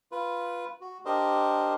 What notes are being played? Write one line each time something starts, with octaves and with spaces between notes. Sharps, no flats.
F4 B4
F#4
D4 G4 A#4 C5 D#5